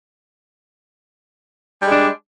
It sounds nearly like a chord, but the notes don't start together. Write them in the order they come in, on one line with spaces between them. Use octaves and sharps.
G3 G#3 D4